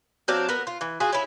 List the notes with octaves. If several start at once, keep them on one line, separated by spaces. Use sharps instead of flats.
F#3 C4 D4 F5
B3 A#4
F4
E3
F4 F#4 G#4
C#4 E4